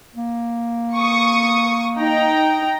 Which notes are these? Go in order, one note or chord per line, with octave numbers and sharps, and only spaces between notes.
A#3
C#6 D#6
D#4 G5 A#5